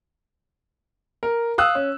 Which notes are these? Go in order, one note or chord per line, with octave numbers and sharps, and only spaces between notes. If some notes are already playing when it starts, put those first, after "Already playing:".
A#4
F5 D#6 E6 F#6
C#4